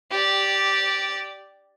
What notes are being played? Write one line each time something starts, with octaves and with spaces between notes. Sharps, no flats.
G4 D5